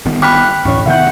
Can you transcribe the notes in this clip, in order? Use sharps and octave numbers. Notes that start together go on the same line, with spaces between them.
G1 D#3 B3
G5 B5 D6 F6 F#6 B6
A1 D2 C#5 C#6
C3 D#3 B3 E5 F#5 G6